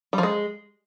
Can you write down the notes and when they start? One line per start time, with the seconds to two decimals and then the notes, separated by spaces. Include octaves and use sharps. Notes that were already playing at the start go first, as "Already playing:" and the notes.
0.13 G3
0.18 F3
0.23 G#3